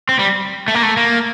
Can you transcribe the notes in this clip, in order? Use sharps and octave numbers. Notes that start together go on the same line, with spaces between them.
C4
G3
A3
A#3
A3
A#3